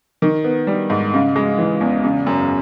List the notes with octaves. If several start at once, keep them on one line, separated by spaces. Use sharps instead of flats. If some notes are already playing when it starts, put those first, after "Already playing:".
D#3
B3
G3
G#2
C#3
G#3
E3
E2
C#3
F#2